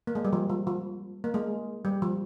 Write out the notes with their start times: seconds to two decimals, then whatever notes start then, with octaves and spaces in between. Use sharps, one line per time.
0.07 A#3
0.15 G#3
0.25 G3
0.33 F3
0.50 F3
0.67 F3
1.24 A#3
1.34 G#3
1.85 G3
2.02 F3